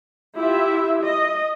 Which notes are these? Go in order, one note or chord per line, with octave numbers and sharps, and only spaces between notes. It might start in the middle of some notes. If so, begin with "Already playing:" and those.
E4 F4 G4 E5
D#5